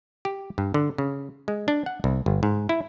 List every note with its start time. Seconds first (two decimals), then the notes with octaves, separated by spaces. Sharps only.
0.25 G4
0.58 G2
0.74 D3
0.98 C#3
1.48 G#3
1.68 D4
1.86 F#5
2.04 C2
2.26 G1
2.43 G#2
2.69 E4